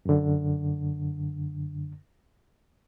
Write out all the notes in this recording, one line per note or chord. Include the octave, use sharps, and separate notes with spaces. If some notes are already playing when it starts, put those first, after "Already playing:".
F#2 D3